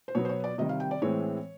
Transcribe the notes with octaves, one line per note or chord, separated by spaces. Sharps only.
C5
B2 F#3 B3 C#5
C5
C#5
D5
C3 D#3 G3 D#5
F5
G5
D5
A2 E3 G#3 C4 C#5